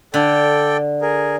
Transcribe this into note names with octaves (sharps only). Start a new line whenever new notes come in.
D3 A4 D5 G5
G#4 A#4